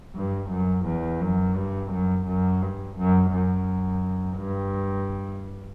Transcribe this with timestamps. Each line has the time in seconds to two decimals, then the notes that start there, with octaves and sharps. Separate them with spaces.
0.15 G2
0.50 F#2
0.86 E2
1.21 F#2
1.56 G2
1.91 F#2
2.26 F#2
2.61 G2
2.97 F#2
3.33 F#2
4.38 G2